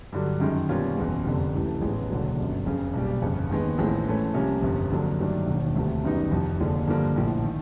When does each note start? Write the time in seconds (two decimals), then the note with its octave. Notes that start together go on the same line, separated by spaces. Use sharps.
0.13 G2 D3 F#3
0.40 F#2 D#3 G#3
0.69 B2 G3 A#3 C#4 F4
0.97 F#1 E2 B2 G#3
1.25 F1 F2 D3
1.53 C#2 C3 E3 A3
1.82 A1 G#2 F3 G#3 B3
2.10 E1 D#2 D3 F#3
2.37 G1 F#2 D3
2.65 F#1 F2 C#3
2.94 B1 A#2 G3
3.22 G1 F2 C#3
3.50 D#2 D#3 G#3 B3
3.78 A1 A2 F3 G#3 C4
4.06 A2 E3 A3 C#4 E4
4.34 C2 C3 F3 A#3 C#4
4.62 G1 F2 C3
4.90 F2 D3 F#3 A#3
5.19 G2 D#3 F#3 A3 D4
5.46 E1 D#2 D#3
5.76 D2 C3 F3 A3
6.04 F#2 D#3 G3 B3 D#4
6.31 F1 F2 C3 F3
6.60 F1 D#2 D3 F3 G#3
6.87 G2 D3 F3 A#3
7.16 A#1 A2 F3
7.43 D#3